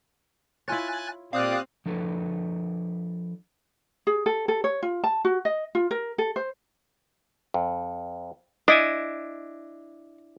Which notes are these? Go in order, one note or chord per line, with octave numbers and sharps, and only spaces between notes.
E4 F4 C#5 G#5 F#6 A6
A#2 C4 G4 D5 F5 D#6 F#6
F3 D4 A4 B4
G#4
A4
A4
C#5
F4
A5
F#4
D#5
F4
A#4
A4
C5
F2
D4 E4 D#5 G#5